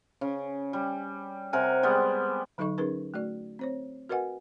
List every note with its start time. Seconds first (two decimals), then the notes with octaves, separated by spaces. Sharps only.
0.21 C#3
0.73 G3
1.53 C3 A#4 F#5 G#5
1.83 G3 G#3 B3
2.58 D3 F#3 D#4 A4 D#5 C#6
2.78 C#4 D#4 G#4 A#4 B4
3.14 A3 F#4 D5
3.59 C4 C5 C#5
4.09 F#4 A#4 B4 D#5 F#5 G#5